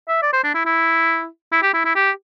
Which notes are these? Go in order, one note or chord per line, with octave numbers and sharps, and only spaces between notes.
E5
D5
C5
D4
E4
E4
E4
G4
E4
E4
G4